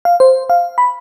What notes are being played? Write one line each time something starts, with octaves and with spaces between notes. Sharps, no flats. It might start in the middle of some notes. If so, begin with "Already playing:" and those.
F5
C5
F5
B5